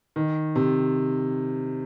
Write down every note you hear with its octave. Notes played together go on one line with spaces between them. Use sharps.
D#3
C3